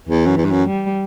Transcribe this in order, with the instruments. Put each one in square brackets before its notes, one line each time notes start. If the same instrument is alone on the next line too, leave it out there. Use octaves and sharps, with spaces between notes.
[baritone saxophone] E2 [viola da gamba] E3
[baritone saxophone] F#2
E2
G2
F#2
[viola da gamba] G3